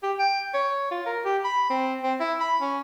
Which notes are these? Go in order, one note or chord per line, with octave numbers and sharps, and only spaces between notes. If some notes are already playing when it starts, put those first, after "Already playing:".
G4
G5
C#5
F4
A#4
G4
B5
C4
C4
E4
B5
C#4